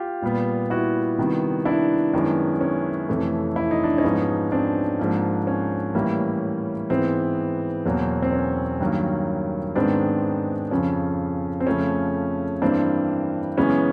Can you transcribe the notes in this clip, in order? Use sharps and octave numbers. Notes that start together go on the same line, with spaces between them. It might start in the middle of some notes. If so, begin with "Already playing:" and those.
Already playing: F4 G4
A#2 G3 B3
E4 F#4
C3 D#3 G3 B3
D4 E4
F#2 D#3 G#3 B3
C#4
F2 C3 E3 A3
E4
D#4
D4
C#4 D#4
G#2 F3 G#3 B3
C4 D4
G#2 F3 A#3
C#4
A2 E3 G3 A#3
G#2 E3 G#3 B3 C4
E2 B2 F#3 A#3
C4
C#4
G2 D#3 F#3 A#3
G#2 D#3 G#3 B3 C4 D4
F2 C#3 F3 C#4
C4
F2 C#3 F3 A3 C#4
G2 E3 G3 A#3 C4 D4
F#2 C#3 E3 G#3 B3 C#4